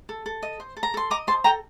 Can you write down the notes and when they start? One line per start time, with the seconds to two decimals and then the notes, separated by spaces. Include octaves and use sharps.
0.09 A4
0.26 A4
0.43 D#5
0.60 C5
0.77 A4
0.83 A#5
0.94 A4 C6
1.10 D#5 A#5 D6
1.27 C5 A5 C6
1.44 A4 G5 A#5